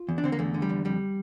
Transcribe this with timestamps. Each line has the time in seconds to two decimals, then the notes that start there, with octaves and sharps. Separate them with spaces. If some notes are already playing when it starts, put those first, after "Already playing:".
Already playing: F4
0.09 E2
0.18 D4
0.24 D3 C4
0.32 A#3
0.39 E2 A3
0.54 D3
0.62 G3
0.69 E2
0.85 F2 G3